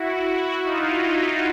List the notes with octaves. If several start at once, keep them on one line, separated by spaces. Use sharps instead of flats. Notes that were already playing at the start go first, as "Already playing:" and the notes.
Already playing: E4 F#4
D#4 F4